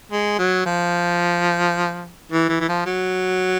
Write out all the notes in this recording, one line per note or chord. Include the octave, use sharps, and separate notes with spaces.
G#3
F#3
F3
E3
E3
E3
F3
F#3